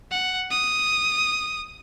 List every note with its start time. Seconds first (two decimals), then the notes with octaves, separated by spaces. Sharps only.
0.11 F#5
0.51 D#6